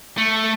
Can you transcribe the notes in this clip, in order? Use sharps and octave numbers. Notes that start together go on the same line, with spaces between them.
A3